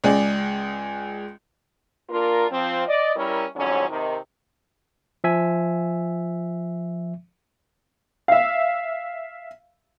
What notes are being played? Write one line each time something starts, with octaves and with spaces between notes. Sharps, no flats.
C#2 G#3 G#4 D5
A#3 D4 F4 A#4
F3 C4
D5 D#5
G3 C#4 E4 A#4
F2 G#2 D3 F#3 C#4
C3 D#3
F3 E5 G#5
E5 F5